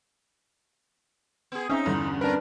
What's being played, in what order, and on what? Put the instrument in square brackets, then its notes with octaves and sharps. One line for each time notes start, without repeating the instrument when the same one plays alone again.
[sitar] B3 G#4
[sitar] G#2 D#4 [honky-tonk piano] C4 E5 [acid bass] C#4
[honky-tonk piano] E2 G2 D3
[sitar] C4 A#4 [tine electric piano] D4 B4